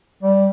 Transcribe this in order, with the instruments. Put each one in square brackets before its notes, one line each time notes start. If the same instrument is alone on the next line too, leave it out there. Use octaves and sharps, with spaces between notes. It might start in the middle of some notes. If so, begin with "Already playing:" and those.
[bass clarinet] G3